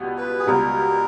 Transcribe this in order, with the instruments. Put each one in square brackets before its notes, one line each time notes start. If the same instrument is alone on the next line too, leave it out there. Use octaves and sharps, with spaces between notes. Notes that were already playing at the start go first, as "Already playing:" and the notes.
Already playing: [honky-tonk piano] C#2 B2 G3 B3
[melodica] B4
G#4
[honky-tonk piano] C#2 B2 G3 B3 [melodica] A#4